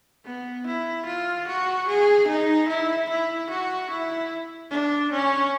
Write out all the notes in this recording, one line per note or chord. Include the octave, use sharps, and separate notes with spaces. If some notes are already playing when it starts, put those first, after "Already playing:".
B3
E4
F4
F#4
G#4
D#4
E4
E4
F#4
E4
D4
C#4